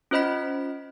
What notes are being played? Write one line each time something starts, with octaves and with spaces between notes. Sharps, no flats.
C#4 F4 C5 D#5 B5 B6